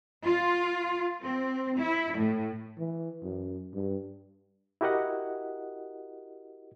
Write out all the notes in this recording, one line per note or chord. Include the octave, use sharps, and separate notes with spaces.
F4
C4
E4
A2
E3
F#2
G2
E4 F#4 G4 A#4 D#5 F#5